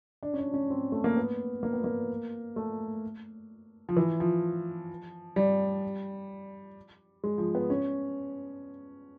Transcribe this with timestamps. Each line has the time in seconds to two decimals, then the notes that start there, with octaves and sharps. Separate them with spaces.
0.23 D4
0.33 C#4
0.39 D4
0.54 C#4
0.70 C4
0.92 A3
1.04 A#3
1.17 B3
1.63 A#3
1.73 B3
1.84 A#3
2.56 A3
3.89 F3
3.97 E3
4.20 F3
5.36 G3
7.24 G#3
7.38 F3
7.55 B3
7.70 C#4